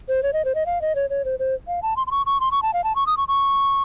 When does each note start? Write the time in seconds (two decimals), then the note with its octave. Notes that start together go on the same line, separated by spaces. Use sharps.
0.08 C5
0.23 C#5
0.33 D#5
0.45 C5
0.55 D#5
0.66 F5
0.82 D#5
0.95 C#5
1.10 C#5
1.25 C5
1.39 C5
1.68 F5
1.83 A5
1.97 C6
2.07 C6
2.11 C#6
2.26 C#6
2.40 C6
2.52 C#6
2.62 A5
2.74 F5
2.84 A5
2.96 C#6
3.07 D#6
3.17 C#6
3.28 C#6